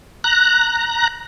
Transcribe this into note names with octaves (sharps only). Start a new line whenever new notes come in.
A#5 F#6